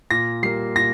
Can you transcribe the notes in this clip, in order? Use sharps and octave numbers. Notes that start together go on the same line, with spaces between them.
A#2 A#6
G3 A#3 C7
A#2 A#6